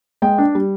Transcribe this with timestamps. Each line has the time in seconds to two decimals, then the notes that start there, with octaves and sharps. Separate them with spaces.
0.22 G#3 G5
0.38 D4
0.55 G3